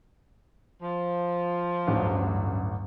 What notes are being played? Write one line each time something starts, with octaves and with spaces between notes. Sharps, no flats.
F3
A1 D2 G2 F#3